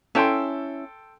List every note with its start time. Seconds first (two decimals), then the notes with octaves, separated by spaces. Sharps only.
0.15 C#4 E4 A4 G5 C6